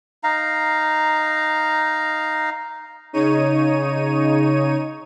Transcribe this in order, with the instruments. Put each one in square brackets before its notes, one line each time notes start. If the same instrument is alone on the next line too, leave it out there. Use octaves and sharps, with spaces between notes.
[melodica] D#4 F5 A#5
[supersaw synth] C#3 D#4 C#5 D#7